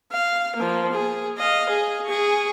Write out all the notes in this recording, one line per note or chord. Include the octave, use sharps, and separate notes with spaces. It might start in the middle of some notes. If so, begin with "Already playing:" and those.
F5
F3 A#3
G#4
D#5 F5
G#4
G#4 C#6